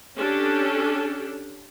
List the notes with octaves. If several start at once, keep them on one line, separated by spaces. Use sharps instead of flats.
C#4 D4 G4 A4